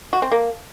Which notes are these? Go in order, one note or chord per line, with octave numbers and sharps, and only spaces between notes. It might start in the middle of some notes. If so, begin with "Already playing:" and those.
F#4
C4
A#3